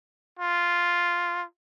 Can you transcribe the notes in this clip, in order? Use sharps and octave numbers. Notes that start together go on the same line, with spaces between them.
F4